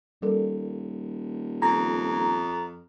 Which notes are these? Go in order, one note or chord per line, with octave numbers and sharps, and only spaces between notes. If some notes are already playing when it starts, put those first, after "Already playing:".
D#1 G3 A4 A#4
F2 A#5